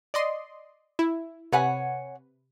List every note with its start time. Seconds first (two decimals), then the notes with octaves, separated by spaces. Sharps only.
0.14 D5 D#5 C6
0.99 E4
1.52 C3 B4 C#5 F#5 G#5